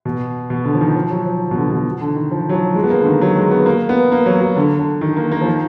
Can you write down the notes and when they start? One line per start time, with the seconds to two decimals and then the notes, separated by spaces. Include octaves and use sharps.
0.05 B2
0.50 B2
0.64 D3
0.74 F3
0.81 D#3
0.95 F3
1.10 F#3
1.26 F3
1.51 B2
1.56 D3
1.70 B2
2.01 D3
2.15 D#3
2.31 F3
2.49 F#3
2.53 F3
2.75 G#3
2.83 B3
2.90 A#3
3.01 D3
3.06 D#3
3.21 F#3
3.35 G#3
3.51 B3
3.66 A#3
3.89 B3
4.12 A#3
4.26 F#3
4.41 F#3
4.56 D3
4.79 D3
5.01 D#3
5.16 A#3
5.32 A#3
5.41 F3
5.46 D#3